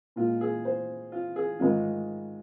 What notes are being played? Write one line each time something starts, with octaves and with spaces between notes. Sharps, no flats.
A#2 G#3 F4
G#4
C5
F4
G#4
G#2 D#3 G#3 F4